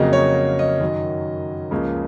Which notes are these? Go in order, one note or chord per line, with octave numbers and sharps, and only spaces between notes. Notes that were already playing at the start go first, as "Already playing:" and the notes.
Already playing: F2 C#3 F#3 A#3 D#5
C#5
D#5
F#2 D#3 F#3
C#2 C#3 F3 A#3